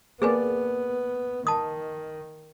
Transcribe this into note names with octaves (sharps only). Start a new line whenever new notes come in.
A#3 B3 G#4 B4 D5 G#5
D#3 A5 D#6